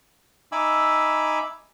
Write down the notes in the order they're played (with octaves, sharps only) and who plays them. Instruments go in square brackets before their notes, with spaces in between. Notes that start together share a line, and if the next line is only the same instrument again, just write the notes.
[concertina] D#4 E5 G#5 B5 D6 E6